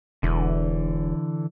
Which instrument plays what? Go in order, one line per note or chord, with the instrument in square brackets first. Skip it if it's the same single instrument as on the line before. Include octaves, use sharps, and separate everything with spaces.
[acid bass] E1 [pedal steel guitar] D3 E3